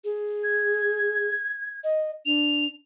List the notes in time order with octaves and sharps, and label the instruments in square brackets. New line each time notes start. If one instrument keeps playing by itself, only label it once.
[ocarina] G#4
[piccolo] G#6
[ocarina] D#5
[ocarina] D4 [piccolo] F7